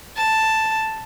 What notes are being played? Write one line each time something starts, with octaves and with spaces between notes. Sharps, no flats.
A5